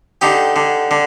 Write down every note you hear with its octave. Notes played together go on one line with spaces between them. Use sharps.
D3 D#4 G4
D3
D3